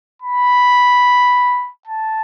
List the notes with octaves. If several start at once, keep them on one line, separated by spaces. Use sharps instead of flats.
B5
A5